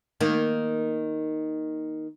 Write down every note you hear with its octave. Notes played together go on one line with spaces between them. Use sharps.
D#3 A#3